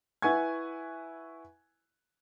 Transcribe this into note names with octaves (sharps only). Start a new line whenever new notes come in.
E4 B4 F#5 G#5 C#6 G#6